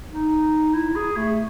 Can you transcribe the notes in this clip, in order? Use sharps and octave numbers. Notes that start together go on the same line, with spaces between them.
D#4
E4
G#4
A3